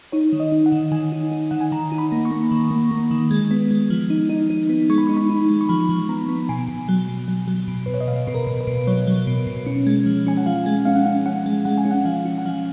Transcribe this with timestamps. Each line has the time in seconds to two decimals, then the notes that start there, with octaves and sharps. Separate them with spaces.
0.12 D#4 C#5
0.33 D#3
0.40 D#5
0.52 D#4
0.66 F#5
0.72 D#3
0.92 D#3 G#5
1.12 D#4
1.32 D#4
1.51 D#3 F#5
1.61 G#5
1.72 D#3 A#5
1.92 D#4
1.98 B5
2.12 A#3
2.25 C#6
2.31 A#3
2.51 D#3
2.71 A#3
2.91 A#3
3.11 D#3
3.31 G#3
3.51 B3
3.71 G#3
3.90 F3
4.10 D#4
4.29 D#4
4.50 D#4
4.70 B3
4.90 G#3 C#6
4.98 B5
5.07 D#4 C#6
5.17 B5
5.30 D#4
5.49 G#3
5.61 C#6
5.69 F3 B5
5.89 F3
6.09 B3 A#5
6.29 B3
6.49 B2 G#5
6.68 B2
6.89 F#3
7.08 B2
7.28 F#3
7.48 F#3
7.68 B2
7.86 B2 B4
7.94 C#5
8.00 D#5
8.08 B2 F5
8.27 B2 B4
8.34 A#4
8.47 B2
8.61 B4
8.67 B2
8.87 F#3 C#5
9.07 F#3
9.27 B2
9.47 B2
9.66 C#4
9.87 G#3
10.06 F3
10.27 C#4 G#5
10.37 F#5
10.46 F3 F5
10.66 G#3
10.85 C#4 F5
10.95 F#5
11.05 C#4 F5
11.26 C#4 F#5
11.46 G#3
11.65 G#3 F#5
11.78 G#5
11.85 C#4
11.91 F#5
12.05 F3 F5
12.25 C#4
12.38 F#5
12.46 F3 F5